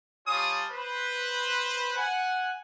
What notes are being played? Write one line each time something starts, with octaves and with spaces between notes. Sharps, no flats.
G3 F4 C#5 G#5 A5 D#6
B4 C5
F#5 G#5